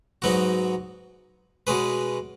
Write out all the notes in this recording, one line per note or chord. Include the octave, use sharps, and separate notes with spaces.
G#2 F#3 B3 D#4 F#4
B2 G#3 C#4 G#4 B4